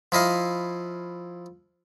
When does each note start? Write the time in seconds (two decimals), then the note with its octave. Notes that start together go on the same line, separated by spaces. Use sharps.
0.12 F3 E4 D#5 F5